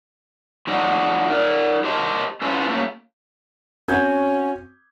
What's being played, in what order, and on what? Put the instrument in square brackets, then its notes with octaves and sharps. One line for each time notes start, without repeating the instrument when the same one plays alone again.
[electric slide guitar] F3 A3 D4 D#4 F#4
D#4 A#4 D5
G4 A#4 C5 D#5 A5
C#4 E4 F4 A4 B4 C5
A3 A#3 C#4
[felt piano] C4 G6 G#6 [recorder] C#4 [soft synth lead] F#4